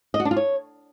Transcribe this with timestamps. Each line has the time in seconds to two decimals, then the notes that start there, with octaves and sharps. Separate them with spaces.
0.14 D#5
0.20 F#4
0.25 D4
0.31 F4
0.36 C#5